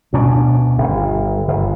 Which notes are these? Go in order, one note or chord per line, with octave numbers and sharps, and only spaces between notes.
D2 B2 C#4 D4
G1
G1